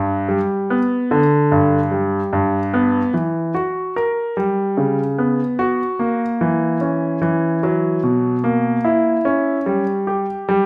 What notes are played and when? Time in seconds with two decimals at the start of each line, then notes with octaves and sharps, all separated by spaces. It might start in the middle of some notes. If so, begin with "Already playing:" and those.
Already playing: G2
0.29 G3
0.70 B3
1.11 D3
1.52 G2
1.91 G3
2.33 G2
2.74 B3
3.14 E3
3.55 F#4
3.96 A#4
4.37 G3
4.77 C#3
5.18 B3
5.59 F#4
5.99 A#3
6.41 E3
6.81 C#4
7.22 E3
7.63 F#3
8.03 B2
8.44 A#3
8.84 E4
9.25 C#4
9.66 G3
10.07 G4
10.49 G3